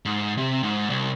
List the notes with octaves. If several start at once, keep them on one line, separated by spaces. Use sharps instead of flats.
G#2
C3
G#2
C2